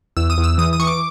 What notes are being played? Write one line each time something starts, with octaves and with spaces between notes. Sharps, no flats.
E2 E6
D#6
E2
E6
E3 D#6
D#6
E3 C#6
D6